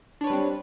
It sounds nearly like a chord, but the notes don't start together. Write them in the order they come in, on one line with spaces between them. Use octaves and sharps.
D4 C#5 B4 G3 C4